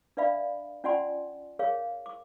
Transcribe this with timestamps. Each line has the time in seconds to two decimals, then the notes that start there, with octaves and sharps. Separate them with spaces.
0.17 D4 B4 D5 E5 F5 B5
0.84 C#4 F4 D5 F#5 G#5 C6
1.59 G#4 A#4 C#5 F5
2.06 D6